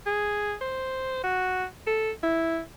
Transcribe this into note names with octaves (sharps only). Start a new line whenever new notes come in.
G#4
C5
F#4
A4
E4